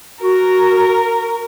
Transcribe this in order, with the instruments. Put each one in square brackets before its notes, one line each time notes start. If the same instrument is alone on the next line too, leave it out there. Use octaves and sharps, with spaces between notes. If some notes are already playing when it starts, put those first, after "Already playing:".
[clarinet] F#4 [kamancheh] A#4